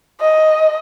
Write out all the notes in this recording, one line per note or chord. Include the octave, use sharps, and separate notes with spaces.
D#5